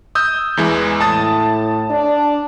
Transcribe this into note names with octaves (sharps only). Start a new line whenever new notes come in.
D#6 E6 G6
E2 E3 G#3
A2 A5 D#6 A6
D4